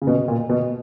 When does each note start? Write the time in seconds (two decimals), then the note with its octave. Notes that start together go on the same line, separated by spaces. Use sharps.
0.02 C#3
0.07 B2
0.28 A#2
0.49 B2